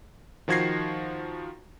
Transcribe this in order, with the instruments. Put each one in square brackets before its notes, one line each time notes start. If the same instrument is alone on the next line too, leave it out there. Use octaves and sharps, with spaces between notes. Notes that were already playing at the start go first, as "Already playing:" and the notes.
[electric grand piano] D#3 F3 F#4 G#6 A#6 C7